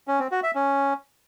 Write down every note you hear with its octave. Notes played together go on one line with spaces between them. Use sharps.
C#4
C4
F#4
E5
C#4